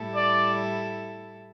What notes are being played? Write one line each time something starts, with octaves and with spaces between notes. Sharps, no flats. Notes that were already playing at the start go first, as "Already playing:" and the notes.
Already playing: A2 G3 E4 A4
D5